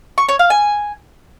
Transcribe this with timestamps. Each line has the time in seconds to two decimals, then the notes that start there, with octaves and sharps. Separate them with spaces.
0.18 C#6
0.29 C#5
0.39 F5
0.50 G#5